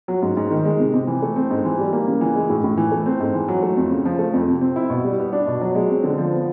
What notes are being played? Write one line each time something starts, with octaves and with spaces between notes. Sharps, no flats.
F#3
G#2
G#2
D#3
G#3
C3
C3
E3
A3
C4
G#2
E3
G3
A#3
C#3
E3
G#3
A2
A2
E3
A3
C4
G#2
E3
F#3
A3
F2
C#3
F3
A3
F2
C3
C4
E4
B2
G3
B3
D4
B2
F#3
G#3
C4
D3
F3
B3